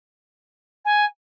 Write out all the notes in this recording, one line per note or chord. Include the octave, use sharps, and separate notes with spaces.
G#5